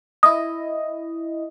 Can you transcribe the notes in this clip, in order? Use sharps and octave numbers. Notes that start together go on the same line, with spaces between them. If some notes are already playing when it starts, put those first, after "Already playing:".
E4 D#5 D#6